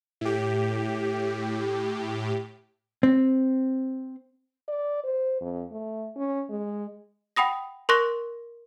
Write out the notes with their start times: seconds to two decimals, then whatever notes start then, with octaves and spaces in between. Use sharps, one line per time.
0.21 A2 G4
3.03 C4
4.68 D5
5.04 C5
5.41 F2
5.71 A3
6.16 C#4
6.50 G#3
7.36 F#5 G5 B5 D#6 A#6
7.89 A#4 C6 C#6 F#6 A#6